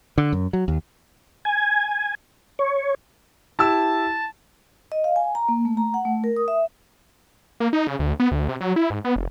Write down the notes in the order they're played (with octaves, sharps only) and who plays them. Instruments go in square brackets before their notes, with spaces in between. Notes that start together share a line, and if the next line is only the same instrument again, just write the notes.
[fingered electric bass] D3
F#2
F#3
D#2
[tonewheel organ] G#5
C#5
[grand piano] E4 G4 E6 [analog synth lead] A5
[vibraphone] D#5
F5
G#5
A#5
A#3
A3
A#5
F#5
A3
A#4
D#6
E5
[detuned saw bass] A#3
D#4
C#3
D2
B3
D2
C3
F#3
E4
G#2
B3
F1